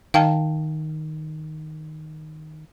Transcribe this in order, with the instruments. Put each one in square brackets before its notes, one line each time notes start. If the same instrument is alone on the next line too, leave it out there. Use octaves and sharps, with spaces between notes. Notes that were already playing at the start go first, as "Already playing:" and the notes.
[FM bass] D#3 [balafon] F5 G5 A5